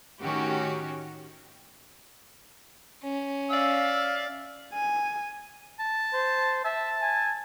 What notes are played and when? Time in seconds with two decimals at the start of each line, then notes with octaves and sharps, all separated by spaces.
0.22 A2 D#3 C#4 F#4 G4
3.03 C#4
3.50 D5 E5 F5 E6
4.74 G#5
5.79 A5
6.13 C5
6.65 E5 A5
7.01 G#5